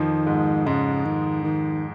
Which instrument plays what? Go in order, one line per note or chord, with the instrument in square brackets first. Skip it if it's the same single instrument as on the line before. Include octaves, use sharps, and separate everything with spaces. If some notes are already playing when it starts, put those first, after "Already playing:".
Already playing: [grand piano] F2 F3 [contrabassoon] D#3
[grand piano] G#2 G#3
[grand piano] G#2 G#3 [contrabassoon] C#3
[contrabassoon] D#3
D#3